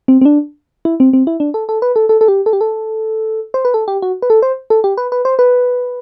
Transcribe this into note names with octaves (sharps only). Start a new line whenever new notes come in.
C4
C4
D4
E4
C4
C4
E4
D4
A4
A4
B4
A4
A4
A4
G4
A4
G4
A4
C5
B4
A4
G4
F#4
B4
A4
C5
A4
G4
B4
B4
C5
B4